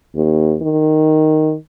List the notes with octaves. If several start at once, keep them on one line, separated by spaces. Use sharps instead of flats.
D#2
D#3